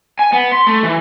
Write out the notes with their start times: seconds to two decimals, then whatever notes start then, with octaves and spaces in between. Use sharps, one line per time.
0.19 G#5
0.32 B3
0.52 C6
0.67 A3
0.84 E3